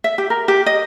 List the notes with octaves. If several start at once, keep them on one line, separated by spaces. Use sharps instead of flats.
E5
G4
A#4
G4
D#5